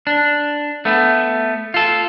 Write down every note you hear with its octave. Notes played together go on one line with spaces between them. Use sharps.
D4
A3 B3
F4 A4